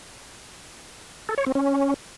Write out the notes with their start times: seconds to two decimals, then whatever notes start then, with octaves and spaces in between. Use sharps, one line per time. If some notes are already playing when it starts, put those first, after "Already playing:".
1.29 A4
1.38 C#5
1.46 C4
1.55 C#4